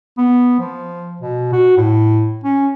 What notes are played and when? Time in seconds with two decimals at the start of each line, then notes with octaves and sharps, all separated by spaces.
0.18 B3
0.60 F3
1.22 B2
1.53 F#4
1.77 A2
2.44 C#4